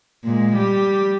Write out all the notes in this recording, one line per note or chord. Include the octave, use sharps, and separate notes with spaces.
A#2 G#3
G3 G4